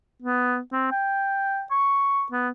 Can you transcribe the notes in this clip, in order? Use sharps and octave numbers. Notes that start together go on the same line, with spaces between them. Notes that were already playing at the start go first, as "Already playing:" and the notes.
B3
C4
G5
C#6
B3